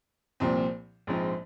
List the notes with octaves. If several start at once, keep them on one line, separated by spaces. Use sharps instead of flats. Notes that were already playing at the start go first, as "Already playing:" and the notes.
C2 A#2 F3 C4
A#1 G#2 F3 C4